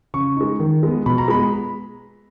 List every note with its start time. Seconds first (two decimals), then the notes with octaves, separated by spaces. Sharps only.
0.14 C#3 C#6
0.36 G#3 D#4
0.60 D#3
0.83 G#3 B3
1.06 B2 B5
1.18 A#5
1.28 G#3 B5
1.33 B3